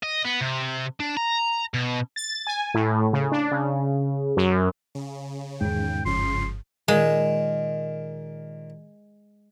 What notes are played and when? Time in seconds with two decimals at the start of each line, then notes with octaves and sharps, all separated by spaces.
0.03 D#5
0.25 B3
0.41 C3
1.00 D4
1.17 A#5
1.74 B2
2.16 A6
2.47 G#5
2.74 A2
3.13 C#3
3.32 D4
3.51 C#3
4.37 F#2
4.95 C#3
5.61 E2 G#2 D#3 G5
6.06 G1 C#3 F3 C6
6.88 A#2 D#3 G#3 D#6